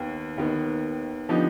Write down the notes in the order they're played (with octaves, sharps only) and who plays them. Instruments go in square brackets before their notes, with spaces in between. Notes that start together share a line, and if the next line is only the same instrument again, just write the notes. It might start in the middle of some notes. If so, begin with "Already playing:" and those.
Already playing: [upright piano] D#2 D#3 B3
D#2 D#3 B3
D3 F3 B3 D#4 G4